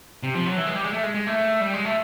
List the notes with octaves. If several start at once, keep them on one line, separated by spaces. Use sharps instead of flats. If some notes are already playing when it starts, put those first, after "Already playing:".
C3
F3
F#3
E3
G#3
G3
G#3
A3
G#3
G#3
A3
G3
G#3
A3